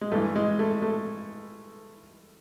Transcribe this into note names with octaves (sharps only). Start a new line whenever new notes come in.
G#3
G2 E3 A3
G#3
A3
A3